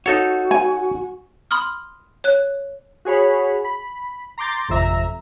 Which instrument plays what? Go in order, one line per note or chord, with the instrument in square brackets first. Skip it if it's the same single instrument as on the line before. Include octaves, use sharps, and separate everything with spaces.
[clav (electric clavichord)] D#4 A4 C#5 [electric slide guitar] F#4
[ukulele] G#5
[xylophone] B5 C6 D#6 F6
C#5 F#6
[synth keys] F#4 G#4 C#5 B5
B5
A#5 C6 D6 G6 A6
G#1 F2 C3 E5 A#5